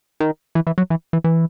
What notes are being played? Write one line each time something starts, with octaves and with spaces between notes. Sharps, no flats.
D#3
E3
E3
F#3
E3
E3
E3